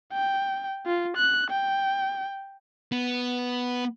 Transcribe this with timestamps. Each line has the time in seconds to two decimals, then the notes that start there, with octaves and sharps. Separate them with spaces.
0.13 G5
0.86 F4
1.17 F#6
1.51 G5
2.92 B3